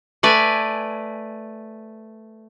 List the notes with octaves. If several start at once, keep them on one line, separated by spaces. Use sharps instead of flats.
A3 B4 D5 G#5